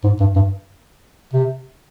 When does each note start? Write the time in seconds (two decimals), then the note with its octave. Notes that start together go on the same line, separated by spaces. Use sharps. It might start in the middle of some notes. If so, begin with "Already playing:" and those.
0.04 G#2
0.20 G2
0.36 G2
1.33 C3